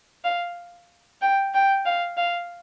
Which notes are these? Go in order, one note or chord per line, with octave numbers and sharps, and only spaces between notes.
F5
G5
G5
F5
F5